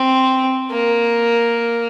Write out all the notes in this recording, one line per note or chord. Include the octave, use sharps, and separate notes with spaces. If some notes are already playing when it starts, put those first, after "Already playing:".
Already playing: C4
A#3